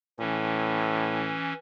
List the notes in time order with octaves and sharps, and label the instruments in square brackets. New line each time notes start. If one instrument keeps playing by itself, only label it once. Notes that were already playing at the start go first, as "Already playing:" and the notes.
[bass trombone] A2 [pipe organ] E3 C#4